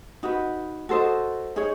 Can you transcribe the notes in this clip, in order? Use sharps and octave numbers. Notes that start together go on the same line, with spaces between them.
D#4 F#4 B4
F#4 A4 C5 D#5
D#4 G#4 C#5